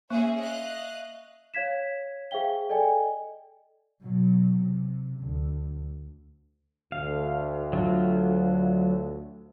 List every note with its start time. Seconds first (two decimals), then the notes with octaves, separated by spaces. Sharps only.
0.10 A#3 C#4 G#4 C5 E5 C#6
0.40 D#5 F5 F#6
1.54 C#5 F5 G#6 B6 E7
2.31 G#4 C5 E5 F5 G5 G7
2.69 A4 D5 D#5 G5 G#5
4.01 B2 F#3
4.57 C3
5.20 D2
6.92 D2 F5
7.73 F#3 F4